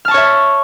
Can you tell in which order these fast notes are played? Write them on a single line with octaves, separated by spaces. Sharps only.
F6 A5 C#6 C#5 E5